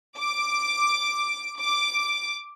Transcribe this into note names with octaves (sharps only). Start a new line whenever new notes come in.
D6
D6